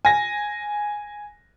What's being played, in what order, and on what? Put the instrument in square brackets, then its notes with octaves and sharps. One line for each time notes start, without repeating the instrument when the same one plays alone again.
[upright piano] G#5 A#6